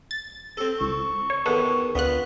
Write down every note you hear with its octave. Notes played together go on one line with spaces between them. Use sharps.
A6
C4 A4
C#2 C#6
C#5
E2 D#3 A4 B4 F#5
D2 B3 F4 F#6